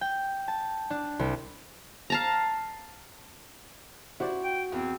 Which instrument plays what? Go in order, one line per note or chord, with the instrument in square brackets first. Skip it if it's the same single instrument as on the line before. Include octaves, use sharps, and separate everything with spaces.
[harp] G5
A5
D4
C2
[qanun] F5 A5 A#5
[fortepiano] E4 C5 D5 [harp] F#4
[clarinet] G5
[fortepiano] E2 [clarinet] C4